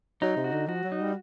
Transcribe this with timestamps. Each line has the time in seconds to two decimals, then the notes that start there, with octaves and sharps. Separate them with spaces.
0.22 F#3 D#4
0.37 C3
0.44 F#4
0.52 D3
0.68 F3 F#4
0.84 F#3
0.92 D#4
1.01 G3